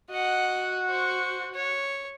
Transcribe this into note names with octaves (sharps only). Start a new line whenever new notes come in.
F#4 D#5 F#5
C5 C#6
C#5